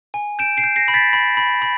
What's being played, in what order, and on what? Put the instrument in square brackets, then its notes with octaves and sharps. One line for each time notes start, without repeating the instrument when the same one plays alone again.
[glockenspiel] G#5
G6 D7 E7
C7 D7
G6
A#6 C7
B5
A6 B6
B5
B5
B5